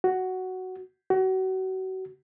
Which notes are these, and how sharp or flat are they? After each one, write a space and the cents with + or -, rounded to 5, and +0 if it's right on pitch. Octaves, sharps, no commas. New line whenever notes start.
F#4 +5
F#4 +30